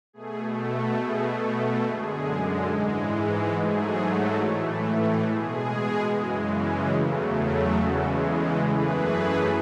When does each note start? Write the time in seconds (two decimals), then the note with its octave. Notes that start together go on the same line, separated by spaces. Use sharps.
0.13 B2 A3 G#4
0.98 B2 A3 G#4
1.83 F#2 D3 G#3 G#4
2.68 G#2 E3 G#3
3.53 G#2 F#3 A3 G#4
4.37 A2 E3 A3
5.22 B2 G#3 G#4
6.07 F#2 C#3 E3 G#3
6.92 E2 C#3 F#3 A3
7.77 E2 C#3 E3 G#3 F#4 A4
8.62 F#2 E3 A3 G#4 B4